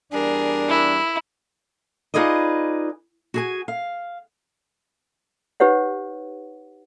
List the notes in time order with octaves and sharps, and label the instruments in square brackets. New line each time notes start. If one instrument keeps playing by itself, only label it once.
[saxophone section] E2 G3 D4 [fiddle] G#4 A#4
[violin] E4
[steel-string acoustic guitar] D#4 F4 G#4 B4 D5 D#5
F#4 G#4 G#5
F5
[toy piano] D#4 G4 B4 C#5 F#5